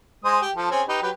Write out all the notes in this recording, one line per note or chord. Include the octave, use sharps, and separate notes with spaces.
G#3 C5 D#6
G4
F3 A4
C4 C#4 G#4
D#4 G4 B4
F#3 G4 B4